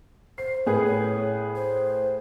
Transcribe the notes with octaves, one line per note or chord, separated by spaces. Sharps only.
C5 C7
A2 G#4 A#4 B4
C#5
C5